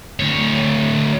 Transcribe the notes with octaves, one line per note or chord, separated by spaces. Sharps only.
D2 C#5